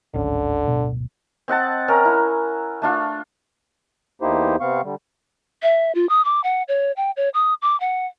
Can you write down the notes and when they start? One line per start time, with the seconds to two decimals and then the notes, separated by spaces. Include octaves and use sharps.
0.14 D1 G#1 D3 C#4
0.68 D1 G1 B2
1.48 C4 D#5 F#5 A5
1.88 C#4 A#4 D#5 A#5
2.05 E4
2.82 A3 D4 F4
4.22 E2 A#3 D#4 E4 G4 C5
4.60 C3 B3 C4 F5 C#6
4.83 D3 G3
5.63 E5
5.95 F4
6.09 D#6
6.25 D6
6.44 F#5
6.68 C#5
6.97 G5
7.17 C#5
7.34 D#6
7.62 D6
7.80 F#5